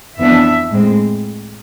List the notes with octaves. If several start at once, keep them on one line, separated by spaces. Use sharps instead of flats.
F2 E3 B3 D4 E5
A2 G#3 C4